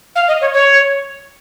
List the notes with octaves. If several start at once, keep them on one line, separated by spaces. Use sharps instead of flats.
F5
D#5
C#5
C#5